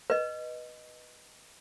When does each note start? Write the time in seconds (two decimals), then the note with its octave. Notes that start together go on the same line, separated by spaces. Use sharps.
0.10 B4 D#5